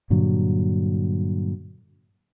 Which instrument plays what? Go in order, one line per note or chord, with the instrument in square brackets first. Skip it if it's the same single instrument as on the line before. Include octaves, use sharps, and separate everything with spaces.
[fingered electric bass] G2 A#2 D3 F#3